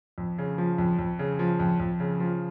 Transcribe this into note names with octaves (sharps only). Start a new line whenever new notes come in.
F2
C#3
F3
F2
F2
C#3
F3
F2
F2
C#3
F3